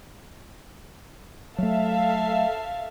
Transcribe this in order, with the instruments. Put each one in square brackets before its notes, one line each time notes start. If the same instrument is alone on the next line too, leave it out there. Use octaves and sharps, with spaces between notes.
[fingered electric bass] F#3 A3 [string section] A4 E5 F5